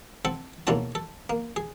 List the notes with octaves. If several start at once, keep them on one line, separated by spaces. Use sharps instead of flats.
C4 A4 F#5
B1 E2 A#3 C#4 F#4 A5
A4
A#3
G#4